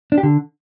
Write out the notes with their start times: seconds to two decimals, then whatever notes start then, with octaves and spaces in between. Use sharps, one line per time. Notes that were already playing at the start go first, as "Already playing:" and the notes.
0.12 D4
0.18 G4
0.23 D3